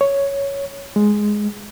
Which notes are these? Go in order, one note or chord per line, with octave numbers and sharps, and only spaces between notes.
C#5
G#3